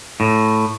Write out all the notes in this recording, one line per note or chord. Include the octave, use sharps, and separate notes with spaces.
A2